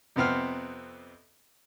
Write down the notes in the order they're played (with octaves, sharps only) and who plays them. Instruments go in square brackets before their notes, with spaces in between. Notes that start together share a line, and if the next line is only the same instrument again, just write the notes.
[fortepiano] F2 C3 B3 C4 F6